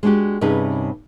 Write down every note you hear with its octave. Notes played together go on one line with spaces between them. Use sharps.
G#3 D4 F#4 G4
G2 C3 C#4 D#4 G#4 B4